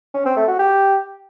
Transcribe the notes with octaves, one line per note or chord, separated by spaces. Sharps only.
C#4
C4
A3
F#4
G4